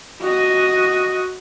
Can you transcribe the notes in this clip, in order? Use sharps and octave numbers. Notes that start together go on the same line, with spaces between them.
F#4 D#5